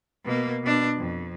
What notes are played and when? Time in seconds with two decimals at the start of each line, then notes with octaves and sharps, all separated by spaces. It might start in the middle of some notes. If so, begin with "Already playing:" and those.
0.25 B2 A#3
0.63 B2 D4
0.97 F2